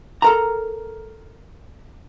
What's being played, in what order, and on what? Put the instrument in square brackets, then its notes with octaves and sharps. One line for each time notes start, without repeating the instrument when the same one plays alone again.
[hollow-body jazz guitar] A4 A#4 A#5